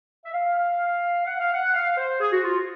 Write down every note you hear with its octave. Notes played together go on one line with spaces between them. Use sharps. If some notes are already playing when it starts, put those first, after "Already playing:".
E5
F5
F#5
F5
F#5
F5
C5
G#4
F#4
F4